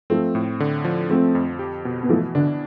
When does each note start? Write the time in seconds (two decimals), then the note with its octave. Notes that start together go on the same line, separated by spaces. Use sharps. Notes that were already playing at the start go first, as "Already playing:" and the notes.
0.10 F3 A3 C4
0.35 A2
0.60 D3
0.84 F3
1.10 F3 A3 C4
1.35 F2
1.59 G4
1.85 B2
2.03 B3
2.09 E3 F3 A3
2.35 D3 D4